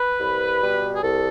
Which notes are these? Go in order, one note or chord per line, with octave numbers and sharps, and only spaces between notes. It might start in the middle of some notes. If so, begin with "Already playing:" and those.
Already playing: B4
C2
B2 G3
G#4
C2 A4